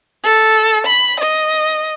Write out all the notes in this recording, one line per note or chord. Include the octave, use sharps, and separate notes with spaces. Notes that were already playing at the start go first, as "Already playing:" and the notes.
A4
B5
D#5